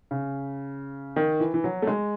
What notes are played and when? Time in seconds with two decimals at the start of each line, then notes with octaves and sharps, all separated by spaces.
0.11 C#3
1.16 D#3
1.40 E3
1.54 E3
1.64 F#3
1.82 A3
1.87 G#3